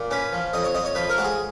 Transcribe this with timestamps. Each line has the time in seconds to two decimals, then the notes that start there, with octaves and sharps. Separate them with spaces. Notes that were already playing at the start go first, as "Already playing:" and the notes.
Already playing: A#2
0.11 C#4 B4
0.33 F3
0.53 F2 D#5
0.64 C#5
0.75 F2 D#5
0.85 C#5
0.95 F3 B4
1.10 A#4
1.17 G#3 F#4
1.25 G#4